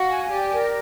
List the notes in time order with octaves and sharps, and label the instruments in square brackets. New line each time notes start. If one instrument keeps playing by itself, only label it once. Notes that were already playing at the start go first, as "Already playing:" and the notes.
Already playing: [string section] F#4 [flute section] F5
[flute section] G#5
[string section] G4 [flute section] D5
[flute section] A#4